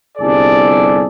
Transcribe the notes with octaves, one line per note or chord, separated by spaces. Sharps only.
G1 C2 G#4 A4 D5